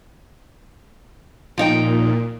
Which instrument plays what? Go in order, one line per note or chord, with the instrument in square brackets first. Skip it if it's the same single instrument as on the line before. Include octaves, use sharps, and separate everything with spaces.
[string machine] A#2 [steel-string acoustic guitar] F3 D#4 G5